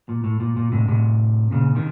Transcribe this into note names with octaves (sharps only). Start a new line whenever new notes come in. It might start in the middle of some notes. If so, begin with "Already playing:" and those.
A#2
A2
A#2
A#2
A2 C3
A2 C3
A#2 C#3
C3 D#3